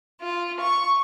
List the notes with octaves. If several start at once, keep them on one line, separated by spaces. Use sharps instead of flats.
F4
C#6